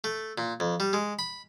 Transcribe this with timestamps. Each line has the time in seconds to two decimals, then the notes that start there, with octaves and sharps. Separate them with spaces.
0.04 A3
0.38 A#2
0.60 F2
0.80 G3
0.93 G#3
1.19 B5